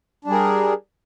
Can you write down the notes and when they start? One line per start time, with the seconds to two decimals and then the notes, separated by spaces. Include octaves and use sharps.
0.25 D4
0.27 G3
0.30 G#4
0.33 A#4